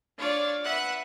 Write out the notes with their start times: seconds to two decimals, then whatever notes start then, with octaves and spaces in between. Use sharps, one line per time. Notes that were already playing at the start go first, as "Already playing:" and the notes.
0.17 D4 F4 C#5 D5
0.64 B4 E5 F#5 F#6